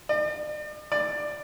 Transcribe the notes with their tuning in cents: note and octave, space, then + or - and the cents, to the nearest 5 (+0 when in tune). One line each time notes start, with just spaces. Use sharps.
D5 +45
D5 +15